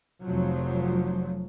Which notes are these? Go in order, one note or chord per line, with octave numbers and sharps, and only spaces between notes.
F1 F3 F#3